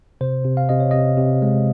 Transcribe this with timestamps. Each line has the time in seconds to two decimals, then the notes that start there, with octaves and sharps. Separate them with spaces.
0.21 C3 C5
0.45 C3
0.57 F5
0.69 C3 D#5
0.80 C#5
0.91 C3 D#5
1.17 C3
1.42 G#3